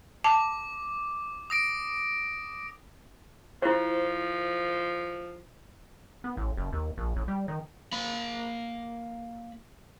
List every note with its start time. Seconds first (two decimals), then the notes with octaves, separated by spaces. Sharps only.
0.24 A5 D6
1.50 D#6 A#6 D7
3.62 F3 E4 C5
6.24 B3
6.37 A1
6.57 F#1
6.73 D#2
6.98 A#1
7.16 A1
7.28 G3
7.48 D#3
7.92 A#3 B5